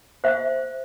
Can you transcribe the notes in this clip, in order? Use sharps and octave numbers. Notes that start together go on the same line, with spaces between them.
C5 E5